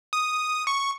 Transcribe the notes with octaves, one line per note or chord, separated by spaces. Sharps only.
D#6
C#6